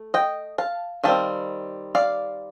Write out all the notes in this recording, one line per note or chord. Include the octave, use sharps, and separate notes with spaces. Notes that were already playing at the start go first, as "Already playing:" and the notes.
Already playing: A3
D#5 G5
F5 A5
D#3 G3 C4 F5 A5
D5 F5